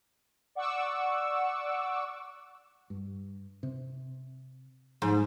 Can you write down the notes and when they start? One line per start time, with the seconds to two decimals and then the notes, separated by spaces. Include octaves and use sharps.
0.55 D5 F#5 C#6 D6 E6
2.90 G2
3.63 C3
5.02 G#2 F3